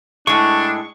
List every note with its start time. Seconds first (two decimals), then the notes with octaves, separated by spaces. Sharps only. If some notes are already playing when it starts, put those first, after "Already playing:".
0.27 A2 G#3 D4 C#6